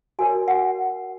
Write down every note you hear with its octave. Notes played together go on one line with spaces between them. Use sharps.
F#4 A#4 C#5 G#5
F#5